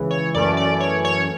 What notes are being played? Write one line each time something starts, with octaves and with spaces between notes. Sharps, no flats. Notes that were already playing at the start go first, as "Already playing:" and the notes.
Already playing: C#2 C#3 E3
C#5
F#2 E3 A3 C#4 D5
D5
C#5
C#5